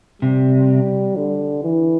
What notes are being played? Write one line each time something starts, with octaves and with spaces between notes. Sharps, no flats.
C3 G3
D3
E3